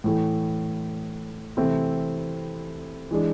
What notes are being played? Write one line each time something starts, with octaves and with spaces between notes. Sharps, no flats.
A2 E3 A3
C3 E3 A3 C4 E4
E3 G#3 D4